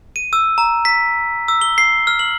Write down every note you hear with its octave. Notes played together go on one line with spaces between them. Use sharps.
D#7
E6
A#5
B6
E6
G7
C7
F6
F#7